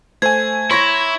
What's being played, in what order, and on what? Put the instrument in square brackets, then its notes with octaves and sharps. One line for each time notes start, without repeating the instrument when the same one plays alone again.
[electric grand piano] A3 G#5 [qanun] C5 [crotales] G#6
[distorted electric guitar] E4 [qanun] C#5 A#5 [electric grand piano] C6 C#6 A#6